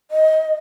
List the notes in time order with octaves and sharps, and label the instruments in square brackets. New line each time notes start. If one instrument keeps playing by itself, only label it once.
[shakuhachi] D#5